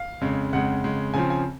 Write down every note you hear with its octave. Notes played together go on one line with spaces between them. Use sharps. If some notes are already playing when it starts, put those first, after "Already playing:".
Already playing: F5
F2 C#3 G#3
F2 C#3 G#3 F#5
F2 C#3 G#3
C#3 F3 C4 G#5
G#5